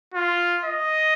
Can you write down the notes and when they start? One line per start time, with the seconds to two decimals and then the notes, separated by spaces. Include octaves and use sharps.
0.14 F4
0.65 D#5